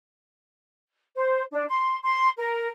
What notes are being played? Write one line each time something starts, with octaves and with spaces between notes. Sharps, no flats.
C5
D4
C6
C6
A#4